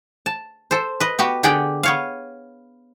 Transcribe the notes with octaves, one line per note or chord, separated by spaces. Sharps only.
A5
A4 C5
B4 D#5
B3 F#4 G4
D3 G4 G#4 D5 F#5 G5
B3 C#5 F5